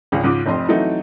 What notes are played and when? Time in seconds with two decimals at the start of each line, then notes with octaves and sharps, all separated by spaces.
0.12 G#1 C#2 C#3 C#4 G#4
0.24 G#2 C#3 F3 D6
0.46 F1 F2 D#5 C6
0.68 E3 F#3 A3 C4 D#4